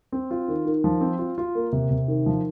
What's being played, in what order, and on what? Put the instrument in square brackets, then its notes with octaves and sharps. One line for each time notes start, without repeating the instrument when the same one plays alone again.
[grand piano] C4
F4
D#3
D#3
F3
C4
F4
F4
A#3
C3
C3
D#3
F3